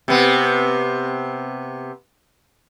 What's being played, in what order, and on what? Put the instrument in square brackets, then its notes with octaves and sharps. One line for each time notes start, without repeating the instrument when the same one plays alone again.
[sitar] C3 B3